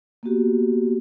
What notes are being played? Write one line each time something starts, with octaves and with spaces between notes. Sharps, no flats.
A#3 B3 F#4 G4